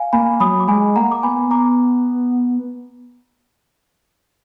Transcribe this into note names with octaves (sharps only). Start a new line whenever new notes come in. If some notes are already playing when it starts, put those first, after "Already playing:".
Already playing: F5 G#5
A#3 G#5 B5
F#3 B5 D#6
D6
G#3 G#5 B5
A#3 F#5 A#5
D6
B3 G#5 B5
A#5 D6